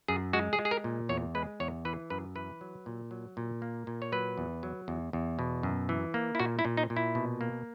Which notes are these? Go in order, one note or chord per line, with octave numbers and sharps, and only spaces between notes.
F#2 G#4
G#3 F#4
G#4
G#3
G#4
A#4
A#2
E2 C#5
G#3 B4
E2 C#5
E3 B4
F#2 B4
E3 B4
F#3
A#2
F#3
A#2
A#3
A#2
C#5
F#3 B4
E2
F#3
E2
E2
B2
F#2
E3
A#3
E4
A#2 F#4
E4
A#2
D#4
A#2
E4
B2
A#3